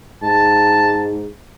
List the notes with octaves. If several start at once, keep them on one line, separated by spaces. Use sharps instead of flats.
G#2 A5